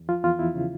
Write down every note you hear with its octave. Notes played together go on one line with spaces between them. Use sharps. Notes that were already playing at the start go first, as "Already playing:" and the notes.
Already playing: E2
F3 F4
E2 F4
E2 E4
C#3